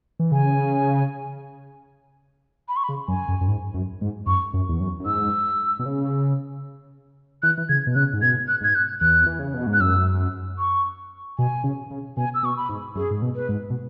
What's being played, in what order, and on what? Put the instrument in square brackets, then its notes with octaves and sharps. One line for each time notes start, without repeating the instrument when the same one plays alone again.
[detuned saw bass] E3
[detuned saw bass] C#3 [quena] G#5
[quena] B5
C#6
B5
[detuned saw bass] C#3
[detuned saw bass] F#2 [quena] G#5
[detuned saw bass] F#2
F#2
G#2
F#2
G#2
[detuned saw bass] F#2 [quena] C#6
[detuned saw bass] F#2
E2
F#2
F#2
[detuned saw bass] G#2 [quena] E6
[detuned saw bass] B2
C#3
[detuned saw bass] E3 [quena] F#6
[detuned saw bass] E3
[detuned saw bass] C#3 [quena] G#6
[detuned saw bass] B2
[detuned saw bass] C#3 [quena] F#6
[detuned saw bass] G#2
[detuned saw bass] B2 [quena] G#6
[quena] F#6
[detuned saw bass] G#2 [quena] G#6
[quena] F#6
[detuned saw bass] E2 [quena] F#6
[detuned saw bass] E3
C#3
B2
G#2
[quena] F#6
[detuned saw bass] F#2 [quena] E6
[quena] C#6
[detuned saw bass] B2 [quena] G#5
[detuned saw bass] C#3
C#3
[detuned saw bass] B2 [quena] G#5
[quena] E6
[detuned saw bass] B2 [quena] C#6
[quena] B5
[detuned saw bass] G#2
[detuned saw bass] F#2 [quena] G#4
[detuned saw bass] G#2
B2
[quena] B4
[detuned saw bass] G#2
B2